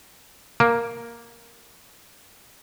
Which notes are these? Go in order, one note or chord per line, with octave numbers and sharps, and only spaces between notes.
A#3